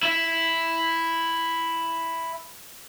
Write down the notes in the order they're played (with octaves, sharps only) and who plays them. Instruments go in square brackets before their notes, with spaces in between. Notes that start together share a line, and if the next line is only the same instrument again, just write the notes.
[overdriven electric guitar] E4 E5